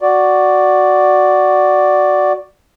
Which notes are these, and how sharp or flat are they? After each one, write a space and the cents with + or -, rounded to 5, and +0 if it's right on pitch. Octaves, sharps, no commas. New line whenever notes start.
F#4 +0 D5 +0